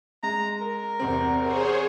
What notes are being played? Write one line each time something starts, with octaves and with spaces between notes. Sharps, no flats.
G#3 A#5
A#4
E2 C3 C4
G#4 C5 C#5